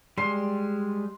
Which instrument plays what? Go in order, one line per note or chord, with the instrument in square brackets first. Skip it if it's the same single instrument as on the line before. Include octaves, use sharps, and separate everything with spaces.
[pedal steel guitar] G3 G#3 [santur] C6